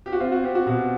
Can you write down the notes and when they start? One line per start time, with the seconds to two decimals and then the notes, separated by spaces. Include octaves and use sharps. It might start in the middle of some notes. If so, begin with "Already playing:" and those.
0.06 G4
0.12 F#4
0.20 C4 F4
0.32 F#4
0.43 C4 G4
0.55 F#4
0.66 B2 F#4